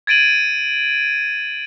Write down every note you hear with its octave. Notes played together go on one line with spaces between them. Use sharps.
G#6 A6 D7 D#7 F#7